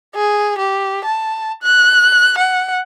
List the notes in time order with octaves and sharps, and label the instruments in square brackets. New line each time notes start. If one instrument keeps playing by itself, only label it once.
[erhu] G#4
G4
A5
F#6
F#5